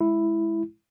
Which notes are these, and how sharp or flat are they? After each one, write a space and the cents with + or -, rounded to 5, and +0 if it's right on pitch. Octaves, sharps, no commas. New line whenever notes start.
G#3 +20 E4 +0